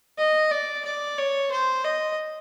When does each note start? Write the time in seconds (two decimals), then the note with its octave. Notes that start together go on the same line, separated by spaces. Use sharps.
0.18 D#5
0.51 D5
0.85 D5
1.18 C#5
1.52 C5
1.84 D#5